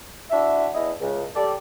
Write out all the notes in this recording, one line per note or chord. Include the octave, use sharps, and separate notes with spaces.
D4 E4 F#4 E5
E2 E4 D#5
C#2
G3 A4 D5